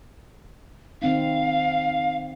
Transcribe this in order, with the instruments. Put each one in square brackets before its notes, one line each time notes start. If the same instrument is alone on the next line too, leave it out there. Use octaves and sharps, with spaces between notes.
[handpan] D#3 C4 D#4 [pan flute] F5